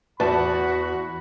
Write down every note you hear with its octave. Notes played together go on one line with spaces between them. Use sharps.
E2 F#4 B4 D5 A5 B5